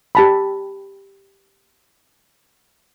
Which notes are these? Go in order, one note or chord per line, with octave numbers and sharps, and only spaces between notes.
G4 A5 B5